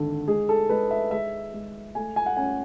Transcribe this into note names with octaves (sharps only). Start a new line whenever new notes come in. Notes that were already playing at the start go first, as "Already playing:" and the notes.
Already playing: G#1 D3 A4
G#3 G#4
A4
G#3 B4
E5
G#3 E5
G#3
A3 G#5
G#5
F#5
C#4 G#5